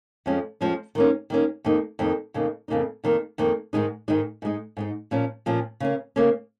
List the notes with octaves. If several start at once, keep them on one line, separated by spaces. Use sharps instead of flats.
F2 F3 G#3 C#4
F2 F3 G#3 C#4
D#3 A#3 C#4
D#3 A#3 C#4
F2 D#3 A#3 D#4
F2 D#3 A#3 D#4
F2 C#3 A#3 D#4
F2 C#3 A#3 D#4
F2 D#3 A#3
F2 D#3 A#3
G#2 D#3 G#3 D#4
G#2 D#3 G#3 D#4
G#2 G#3 D#4
G#2 G#3 D#4
A#2 F3 C#4
A#2 F3 C#4
C#3 A#3 C#4
C#3 A#3 C#4